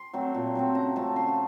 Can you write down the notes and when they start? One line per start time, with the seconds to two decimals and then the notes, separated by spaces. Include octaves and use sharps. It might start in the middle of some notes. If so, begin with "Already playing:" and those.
Already playing: C6
0.13 F#3 A3 C4
0.34 A#2
0.55 F#3 A3 C4
0.75 C#3 A#5
0.96 F3 A3 A5
1.16 C#3 C6